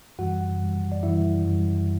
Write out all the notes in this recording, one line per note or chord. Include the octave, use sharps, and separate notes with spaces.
F#2 E3 G3 F#4 F#5
F#2 E3 G3
D5
F#2 E3 G3 E4 E5
F#2 E3 G3